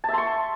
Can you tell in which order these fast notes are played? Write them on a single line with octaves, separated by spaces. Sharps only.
A5 E5 C6 C#6